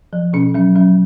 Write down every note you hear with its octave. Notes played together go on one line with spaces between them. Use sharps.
F3
B2 C#4
F#3 C#4
F#3 C#4